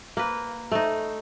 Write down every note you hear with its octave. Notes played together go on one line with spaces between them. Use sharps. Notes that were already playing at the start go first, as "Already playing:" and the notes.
A#3 B4
A3 D#4